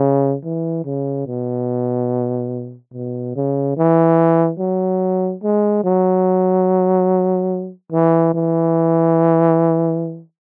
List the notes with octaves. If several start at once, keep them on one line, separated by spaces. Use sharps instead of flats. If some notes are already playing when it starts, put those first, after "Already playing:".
Already playing: C#3
E3
C#3
B2
B2
C#3
E3
F#3
G#3
F#3
E3
E3